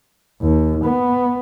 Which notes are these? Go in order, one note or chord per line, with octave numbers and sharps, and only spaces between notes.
D#2
B3